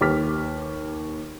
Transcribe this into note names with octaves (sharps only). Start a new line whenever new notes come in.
D#2 G4 B4 D6 F6 B6